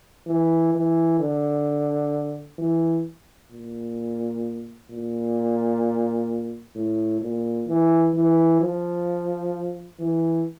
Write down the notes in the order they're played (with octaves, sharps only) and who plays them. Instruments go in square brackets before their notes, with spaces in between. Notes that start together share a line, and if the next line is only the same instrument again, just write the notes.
[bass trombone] E3
E3
D3
E3
A#2
A#2
A2
A#2
E3
E3
F3
E3